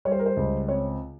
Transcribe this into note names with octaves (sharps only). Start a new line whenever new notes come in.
G3 C#5
C5
A#4
C5
C#2
C4 C#5